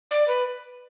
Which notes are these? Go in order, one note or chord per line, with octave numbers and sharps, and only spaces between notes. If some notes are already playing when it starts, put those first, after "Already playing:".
D5
B4